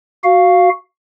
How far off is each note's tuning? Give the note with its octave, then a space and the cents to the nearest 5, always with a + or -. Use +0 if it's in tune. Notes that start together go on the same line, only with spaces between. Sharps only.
F#4 +0 F5 +0